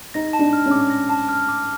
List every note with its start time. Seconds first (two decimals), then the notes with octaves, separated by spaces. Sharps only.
0.14 D#4 A#6
0.33 A5
0.39 D4
0.53 F6
0.66 C#4
0.71 D6
0.90 A#6
1.09 A5
1.29 F6
1.49 D6